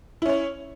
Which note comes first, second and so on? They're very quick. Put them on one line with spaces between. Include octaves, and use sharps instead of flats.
E4 C#4 C#5